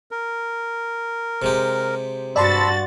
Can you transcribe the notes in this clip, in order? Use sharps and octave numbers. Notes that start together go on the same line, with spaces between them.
A#4
C3 G#3 G4
G2 F#4 D5 A5 B5 C6 E6 A6